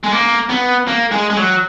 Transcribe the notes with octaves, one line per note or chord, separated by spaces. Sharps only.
G#3
A#3
B3
A#3
G#3
G#3
F#3